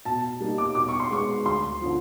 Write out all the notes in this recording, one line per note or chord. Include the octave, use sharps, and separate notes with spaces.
B2 A5
G3 A#3 D#4
D6
B2 D6
C#6
C6
G#3 B3 C#6
D2 C6
D3 F3